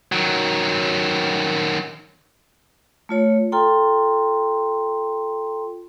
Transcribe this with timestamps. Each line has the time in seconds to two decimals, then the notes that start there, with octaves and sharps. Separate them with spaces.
0.12 D#3 F#3
3.09 A3 F4 C#5
3.52 F4 A4 G5 A#5 C6